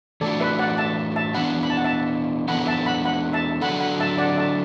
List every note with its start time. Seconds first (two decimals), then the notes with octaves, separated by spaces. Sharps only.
0.21 E3 A3 D4 F#4 A4 D5
0.40 B4 E5
0.59 D5 F#5
0.78 E5 A5
1.16 E5 A5
1.35 E3 B3 D4 F#5 B5
1.63 B5
1.70 A5
1.77 F#5
1.84 E5 A5
2.48 E3 B3 D4 A4 F#5 B5
2.67 E5 A5
2.86 F#5 B5
3.05 F#5 B5
3.33 E5 A5
3.61 D3 F#3 D4 A4 F#5 B5
3.80 F#5 B5
4.00 E5 A5
4.18 D5 F#5
4.37 E5 A5